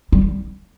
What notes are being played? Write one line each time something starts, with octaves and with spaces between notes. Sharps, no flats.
G3